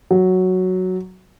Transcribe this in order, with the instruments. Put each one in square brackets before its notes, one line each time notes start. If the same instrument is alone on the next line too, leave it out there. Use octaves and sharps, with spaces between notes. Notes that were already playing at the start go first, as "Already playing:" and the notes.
[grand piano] F#3